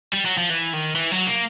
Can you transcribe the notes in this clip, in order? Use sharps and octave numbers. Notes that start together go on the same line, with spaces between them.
G3
F#3
F3
E3
D#3
E3
F#3
A#3